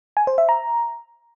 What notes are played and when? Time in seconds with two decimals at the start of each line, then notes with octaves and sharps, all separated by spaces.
0.17 G#5
0.27 C5
0.38 E5
0.49 A#5